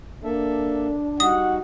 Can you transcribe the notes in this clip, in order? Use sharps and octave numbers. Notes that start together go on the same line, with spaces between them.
A#3 D4 A4 E5
G3 D#4 F#4 F#5 D#6